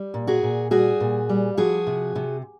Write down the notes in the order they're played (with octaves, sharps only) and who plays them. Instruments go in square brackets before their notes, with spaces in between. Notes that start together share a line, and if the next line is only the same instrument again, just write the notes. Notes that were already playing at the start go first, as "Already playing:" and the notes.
Already playing: [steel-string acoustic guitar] G3
A#2
F#4 G#4
A#2
G3 F#4 G#4
A#2
G3
F3 F#4 G#4
C3
C3